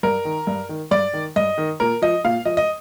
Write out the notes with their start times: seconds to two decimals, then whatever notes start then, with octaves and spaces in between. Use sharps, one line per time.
0.03 G2 A#4
0.25 D#3
0.47 G2
0.69 D#3
0.91 G2 D5
1.14 D#3
1.36 G2 D#5
1.58 D#3
1.80 A#2 A#4
2.02 F3 D#5
2.24 A#2 F5
2.45 F3 D#5
2.57 D#5